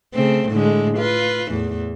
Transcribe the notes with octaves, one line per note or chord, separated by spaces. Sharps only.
C#3 A3 C4
A2 D3 G#3
F4 B4
E2 A2 E3